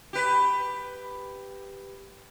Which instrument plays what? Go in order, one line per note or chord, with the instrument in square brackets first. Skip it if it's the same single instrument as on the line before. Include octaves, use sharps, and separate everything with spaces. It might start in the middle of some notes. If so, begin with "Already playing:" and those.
[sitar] G4 B4